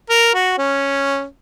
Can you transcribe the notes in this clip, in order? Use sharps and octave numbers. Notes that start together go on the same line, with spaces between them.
A#4
F#4
C#4